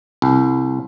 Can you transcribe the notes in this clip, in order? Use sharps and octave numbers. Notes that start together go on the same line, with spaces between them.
C2